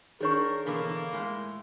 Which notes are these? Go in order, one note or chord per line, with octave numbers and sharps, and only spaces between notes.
D#3 D4 G#4 A#4 C5 C#5 C#6
B2 D3 E3 A#3
A2 G#3